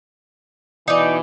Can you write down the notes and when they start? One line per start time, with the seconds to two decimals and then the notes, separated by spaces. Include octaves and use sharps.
0.88 B2 E3 D#4 D5